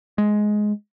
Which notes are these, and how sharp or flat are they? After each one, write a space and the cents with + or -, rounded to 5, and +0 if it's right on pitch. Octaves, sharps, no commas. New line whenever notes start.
G#3 +10